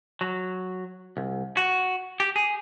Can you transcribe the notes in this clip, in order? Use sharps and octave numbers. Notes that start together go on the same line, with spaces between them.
F#3
C2
F#4
G4
G#4